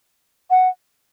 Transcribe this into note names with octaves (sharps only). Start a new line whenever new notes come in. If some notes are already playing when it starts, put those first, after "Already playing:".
F#5